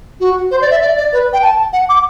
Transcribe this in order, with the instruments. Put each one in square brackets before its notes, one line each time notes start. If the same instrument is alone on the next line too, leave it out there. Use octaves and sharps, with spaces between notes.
[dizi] F#4
C5
D5
E5
D5
D5
B4
G5
A5
F#5
D6